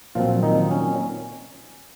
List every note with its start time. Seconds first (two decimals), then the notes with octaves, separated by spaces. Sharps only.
0.15 A#2 F3 F#3 C4 F4
0.43 D#3 D#4
0.71 C#4